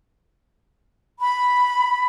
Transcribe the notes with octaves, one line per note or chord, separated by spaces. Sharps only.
B5